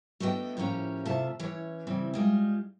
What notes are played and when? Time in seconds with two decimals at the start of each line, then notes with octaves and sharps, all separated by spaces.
0.20 A3 B3 D4 F#4 D#5 G5
0.57 A2 F3 A#3 C#4 G4
1.05 C3 A3 F4 E5 A5
1.40 E3 C#4 C#5
1.87 C#3 E3 G3 C4
2.14 G3 G#3 F4